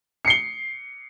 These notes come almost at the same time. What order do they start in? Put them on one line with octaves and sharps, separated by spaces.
C#7 C7 G7